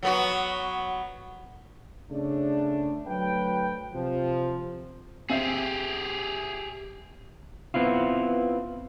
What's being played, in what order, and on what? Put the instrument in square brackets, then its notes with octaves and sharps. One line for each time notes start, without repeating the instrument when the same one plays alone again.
[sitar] F#3 B3 F#4
[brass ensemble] C#3 A3 D4
D2 F#3 B4 G5
C3 F3
[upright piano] C4 E5 C7 [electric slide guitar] G4 G#4
[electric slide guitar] B3 C4 E4 F4